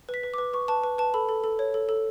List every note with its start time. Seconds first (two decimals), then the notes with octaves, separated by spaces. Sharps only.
0.09 B4
0.14 B6
0.23 B4
0.34 B4 D6
0.53 B4 C#6
0.68 B4 A5
0.84 B4
0.98 B4 A5
1.14 A4 B5
1.29 A4
1.44 A4
1.59 C#5
1.74 A4
1.89 A4